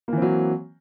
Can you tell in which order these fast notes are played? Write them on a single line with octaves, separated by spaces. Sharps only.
A#3 E3 C4 F#3